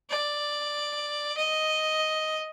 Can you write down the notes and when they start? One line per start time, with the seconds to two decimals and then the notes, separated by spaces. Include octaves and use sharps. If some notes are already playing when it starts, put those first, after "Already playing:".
0.10 D5
1.37 D#5